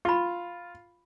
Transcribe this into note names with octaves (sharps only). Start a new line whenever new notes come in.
F4 B5 C#6